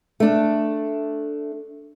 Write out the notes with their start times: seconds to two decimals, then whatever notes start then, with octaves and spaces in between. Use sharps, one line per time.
0.20 A3 D4